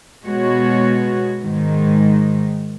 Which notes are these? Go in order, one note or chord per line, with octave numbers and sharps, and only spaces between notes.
B2 G#3 B3 F#4 C#5
G#2 D#3 G#3